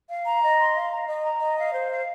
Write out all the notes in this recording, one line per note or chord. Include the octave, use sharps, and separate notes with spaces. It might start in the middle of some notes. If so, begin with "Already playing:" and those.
F5
A#5
D#5
C6
F5
A#5
D#5
A#5
D#5
F5
C5
F5